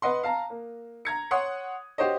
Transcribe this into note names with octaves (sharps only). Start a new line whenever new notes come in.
B4 D#5 F#5 C6
F5 A5 A#5
A#3
A#5 G#6 C#7
C#5 F#5 C6 D#6
F#4 G4 C5 C#5 D#5